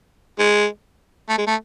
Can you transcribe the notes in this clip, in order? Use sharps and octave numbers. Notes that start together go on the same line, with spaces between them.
G#3
A3
G#3
A3